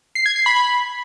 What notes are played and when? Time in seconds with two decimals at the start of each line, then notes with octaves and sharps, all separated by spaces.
0.15 C7
0.26 G#6
0.36 C7
0.46 B5
0.56 B5